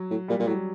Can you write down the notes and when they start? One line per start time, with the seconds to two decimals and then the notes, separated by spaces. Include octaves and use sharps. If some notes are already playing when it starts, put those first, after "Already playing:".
Already playing: F#3
0.10 A2
0.28 A#2 G3
0.40 A#2
0.47 A2 F#3